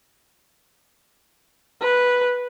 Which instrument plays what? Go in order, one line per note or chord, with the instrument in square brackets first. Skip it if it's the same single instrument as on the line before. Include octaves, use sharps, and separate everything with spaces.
[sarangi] B4